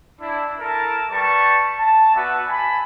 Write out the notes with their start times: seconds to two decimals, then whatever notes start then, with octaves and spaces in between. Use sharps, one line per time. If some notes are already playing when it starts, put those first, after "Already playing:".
0.20 D4 E4
0.59 E4 A4 A#4 E5 A5
1.11 G3 B4 A5 C#6
1.78 A5
2.14 B3 F#4 B4 D5 E5
2.47 G#5 A5 B5